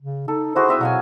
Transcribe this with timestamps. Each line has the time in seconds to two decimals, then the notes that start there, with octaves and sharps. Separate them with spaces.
0.02 C#3
0.28 D#4 A4
0.55 E4 F#4 G#4 C5
0.68 C4 E5 D#6
0.81 B2 F#3 F5 G#5